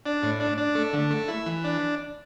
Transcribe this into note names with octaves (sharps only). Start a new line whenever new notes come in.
D4
A2
D4
D4
A3
D3
A3
E4
E3
D4